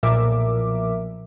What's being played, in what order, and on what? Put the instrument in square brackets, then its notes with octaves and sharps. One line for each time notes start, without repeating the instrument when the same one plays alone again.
[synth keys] B1 A#2 F3 A#4 E5 D6